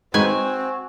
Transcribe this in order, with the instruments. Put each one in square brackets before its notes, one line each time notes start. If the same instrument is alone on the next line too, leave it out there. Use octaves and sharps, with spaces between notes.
[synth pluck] G#3 D#4 B4 [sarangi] C4 [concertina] F#4 [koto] G#5